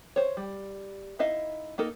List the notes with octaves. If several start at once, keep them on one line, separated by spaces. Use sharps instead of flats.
C5 C#5
G3
D#4 E4 D#5 F5
A#3 D#4 A4 A#4